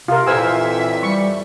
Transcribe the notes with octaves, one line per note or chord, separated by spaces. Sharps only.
C3 F4 A#4
F2 A#2 E3 C5 E5 G#5 E6
G3 C#6